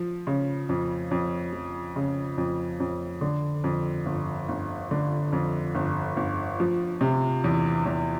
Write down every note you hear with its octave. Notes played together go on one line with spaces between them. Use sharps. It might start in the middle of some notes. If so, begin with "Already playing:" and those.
Already playing: F3
C#3
F2
F2
F3
C#3
F2
F2
D3
F2
G1
G1
D3
F2
G1
G1
F3
C3
E2
E2